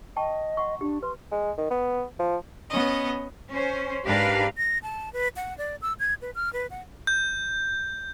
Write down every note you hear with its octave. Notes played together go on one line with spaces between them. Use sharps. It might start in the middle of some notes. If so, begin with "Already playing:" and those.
D#5 G5 A5 C#6
F#5 C6 C#6
D4 G4
B4 C6
G#3
D#3
B3
F3
B3 C#4 D#5
C#4 C5
G#2 D4 G4 A#4 B4 F5
A#6
A5
B4
F#5
D5
E6
G#6
B4
F6
B4
F#5
G6